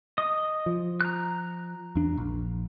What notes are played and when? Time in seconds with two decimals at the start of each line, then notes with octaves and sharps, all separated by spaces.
0.18 D#5 D#6
0.66 F3
1.01 A#5 F#6
1.95 E2 D4
2.17 A#1